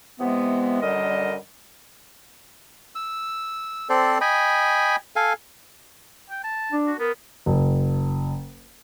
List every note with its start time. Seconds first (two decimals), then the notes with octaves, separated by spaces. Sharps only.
0.19 C3 E3 G#3 B3
0.81 F#2 D3 G3 A#4 D#5
2.95 E6
3.89 C4 A4 C5 D5
4.21 D#5 G5 G#5 B5
5.16 A4 F5 G#5
6.30 G5
6.44 A5
6.72 D4
6.87 F#4
6.99 B3 A#4
7.46 F#1